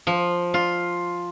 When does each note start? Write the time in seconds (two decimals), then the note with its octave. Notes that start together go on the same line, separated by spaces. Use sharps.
0.07 F3
0.54 F4